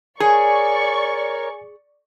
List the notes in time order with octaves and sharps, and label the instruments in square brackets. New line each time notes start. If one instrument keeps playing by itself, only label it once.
[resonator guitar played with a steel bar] G#4 [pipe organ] A#4 C#5 [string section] D5 C#6 [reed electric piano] G#5